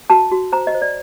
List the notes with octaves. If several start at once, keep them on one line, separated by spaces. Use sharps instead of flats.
F#4 A5
F#4
C5 A#5
D#5
C5
D5